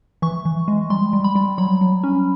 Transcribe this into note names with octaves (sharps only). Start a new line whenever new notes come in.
E3 C#6
E3
G#3
G3 C6
G3
B5
G3
F#3 B5
F#3
C#4